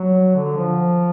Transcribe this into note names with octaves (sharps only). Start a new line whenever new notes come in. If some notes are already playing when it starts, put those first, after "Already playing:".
Already playing: F#3
D3
F3